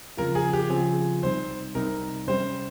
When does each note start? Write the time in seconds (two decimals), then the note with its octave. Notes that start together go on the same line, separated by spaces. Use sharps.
0.17 C#3 F3 C4 F4 A#4
0.35 G#4
0.53 G4
0.70 C#3 F3 C4 F4 G#4
1.23 C2 C3 G3 C4 D#4 C5
1.75 C2 C3 G3 C4 D#4 A#4
2.27 C3 G3 C#4 C5